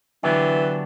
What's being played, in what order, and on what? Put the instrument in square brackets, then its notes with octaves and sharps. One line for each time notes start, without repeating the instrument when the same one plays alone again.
[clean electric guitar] D3 F#3 B3 D4 G4 [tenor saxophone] E3